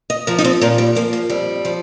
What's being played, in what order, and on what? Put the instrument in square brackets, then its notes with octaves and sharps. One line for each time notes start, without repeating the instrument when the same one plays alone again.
[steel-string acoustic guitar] D#5
F3 A#4
D#4
C4
A#2 A#3
G3
F3 A#3
A#3
F2 G3
F3